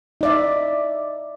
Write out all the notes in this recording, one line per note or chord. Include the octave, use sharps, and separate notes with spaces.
D#4 D5 E5